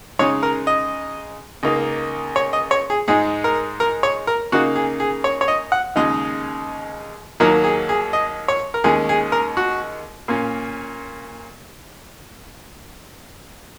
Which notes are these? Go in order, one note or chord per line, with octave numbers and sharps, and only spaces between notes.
C#3 G#3 D#4 C#5
A#4
D#5
C#2 C#3 A#3 D#4
C#5
D#5
C#5
G#4
G#2 G#3 D#4 G#4
A#4
A#4
C#5
A#4
C#3 A#3 D#4 F#4
G#4
G#4
C#5
C#5
D#5
F#5
D#2 C#3 G#3 D#4 D#5
D#2 D#3 F#3 A#3 D#4 A#4
G#4
G#4
D#5
C#5
A#4
D#2 D#3 G#3 C#4 G#4
G#4
A#4
F#4
A#2 A#3 C#4